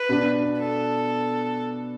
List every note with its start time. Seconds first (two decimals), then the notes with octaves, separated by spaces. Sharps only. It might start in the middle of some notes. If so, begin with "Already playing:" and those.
Already playing: B4
0.09 B2 B3 D4
0.58 A4